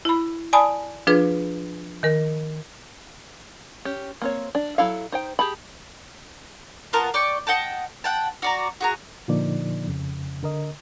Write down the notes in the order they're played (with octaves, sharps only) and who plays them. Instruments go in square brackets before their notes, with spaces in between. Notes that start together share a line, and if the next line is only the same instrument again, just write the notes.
[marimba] E4 B5
D5 G#5 A5 B5 D#6
F3 D4 F4 G#4 B4
D#3 A#4
[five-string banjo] C#4 G4
A#3 C4 C#5
D4
F#3 E4 A4 F5
D#4 C5 G5
G4 G#4 A5 B5
[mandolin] B3 F4 A#4 A5
D5 G5 C#6
D#5 F#5 G5 A5
F#5 G5 A5
F#4 D5 A#5
F#4 G#4 A#5
[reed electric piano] A#2 D3 F3 A#3 D#4 D5
F2 C#3
D3 A#4 D#5